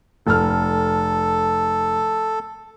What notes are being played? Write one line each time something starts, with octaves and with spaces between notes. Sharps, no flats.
F1 A4 F6